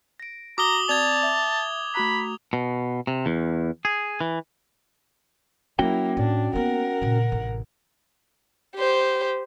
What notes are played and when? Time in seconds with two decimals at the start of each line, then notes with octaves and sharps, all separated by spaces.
0.20 A#6 D7
0.58 F#4 A#5 D6 D#6 G7
0.89 C4 D5 A5 D#6 G#6 F7
1.23 E5
1.95 A3 F#4 A#5 B5
2.53 B2
3.07 C3
3.26 E2
3.85 G#4
4.21 E3
5.79 F#3 A#3 C#4 E4 F#4 G5
6.17 A2 D4
6.53 A#3 B3 A#4 F#5
7.02 A#2 C#3
7.32 A1 C3
8.76 G4 C5